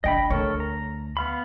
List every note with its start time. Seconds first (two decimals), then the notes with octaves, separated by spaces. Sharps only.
0.04 F#1 D4 D#5 G5 B5
0.30 D2 A4 A#4 C#5
0.60 A#5
1.17 B3 F5 B5